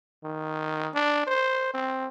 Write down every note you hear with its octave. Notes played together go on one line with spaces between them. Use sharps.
D#3
D4
C5
C4